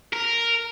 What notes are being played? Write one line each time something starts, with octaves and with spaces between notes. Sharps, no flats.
A#4